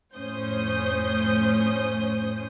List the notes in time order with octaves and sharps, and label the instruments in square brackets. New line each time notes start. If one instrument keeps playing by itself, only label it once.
[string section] F2 A2 C#4 C5 D#6 G6